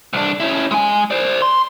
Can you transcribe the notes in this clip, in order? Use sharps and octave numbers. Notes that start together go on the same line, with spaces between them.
C2 D4
C#4 E4
G#3 G#5
C5 D5
C6